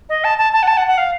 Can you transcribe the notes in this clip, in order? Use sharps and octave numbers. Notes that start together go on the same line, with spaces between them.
D#5
A5
A5
A5
F#5
A5
F#5
F#5
F5